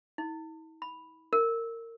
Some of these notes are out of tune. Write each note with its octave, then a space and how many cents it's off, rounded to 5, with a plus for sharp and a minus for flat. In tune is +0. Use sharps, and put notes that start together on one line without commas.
E4 -45
B5 +0
A#4 -25